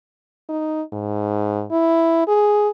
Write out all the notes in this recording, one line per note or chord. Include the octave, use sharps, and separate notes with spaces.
D#4
G#2
E4
G#4